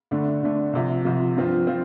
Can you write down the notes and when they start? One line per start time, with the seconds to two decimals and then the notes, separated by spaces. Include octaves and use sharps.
0.11 D2 D3 A3 D4
0.43 D2 D3 A3 D4
0.73 C2 C3 F3
1.05 C2 C3 F3
1.36 G2 F3 C4 F4
1.67 F3 C4 F4